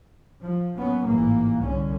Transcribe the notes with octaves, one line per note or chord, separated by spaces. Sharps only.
F3
A#2 F#3 B3 C#4
A1 G#2 E3 A#3
C2 D3 C#4